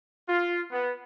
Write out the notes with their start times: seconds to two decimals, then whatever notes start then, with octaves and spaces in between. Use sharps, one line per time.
0.29 F4
0.72 B3